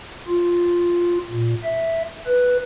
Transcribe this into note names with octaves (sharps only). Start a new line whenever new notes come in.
F4
A#2
E5
B4